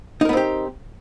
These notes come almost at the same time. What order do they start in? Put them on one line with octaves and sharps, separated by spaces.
D#4 A#4 B3 C4 G4